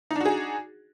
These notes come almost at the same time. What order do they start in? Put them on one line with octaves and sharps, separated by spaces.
D#4 D4 F#4 G#4